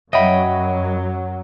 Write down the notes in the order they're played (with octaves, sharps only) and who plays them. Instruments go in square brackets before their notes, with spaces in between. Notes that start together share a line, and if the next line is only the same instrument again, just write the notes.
[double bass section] F#2 F#3 [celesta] C#5 F#5 [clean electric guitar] D#5 G5 B5 [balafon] E5